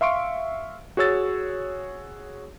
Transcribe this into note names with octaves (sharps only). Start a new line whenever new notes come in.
E5 F5 C6 C#6 D7
F#4 G#4 C#5 E6 A6